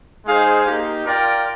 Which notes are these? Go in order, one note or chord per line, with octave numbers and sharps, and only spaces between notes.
G#3 D#4 G#4 C5 F5
A#3 D#4 G4
F4 A#4 D5 G5